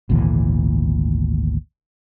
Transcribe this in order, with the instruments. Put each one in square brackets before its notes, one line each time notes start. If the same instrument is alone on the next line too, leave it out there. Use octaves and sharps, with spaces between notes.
[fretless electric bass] G#1 D2 A#2 E3